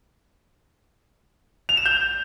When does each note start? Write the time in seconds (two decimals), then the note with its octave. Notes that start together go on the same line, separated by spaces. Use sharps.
1.69 F7
1.77 E7
1.86 G6